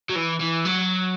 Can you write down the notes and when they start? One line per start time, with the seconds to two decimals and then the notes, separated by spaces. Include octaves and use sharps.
0.10 F#3
0.16 E3
0.40 E3
0.65 F#3